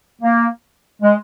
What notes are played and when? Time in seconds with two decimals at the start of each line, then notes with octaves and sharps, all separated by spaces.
0.22 A#3
1.02 G#3